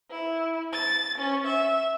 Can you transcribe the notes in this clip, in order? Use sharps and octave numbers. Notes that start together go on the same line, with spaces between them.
E4
A6
C#4
E5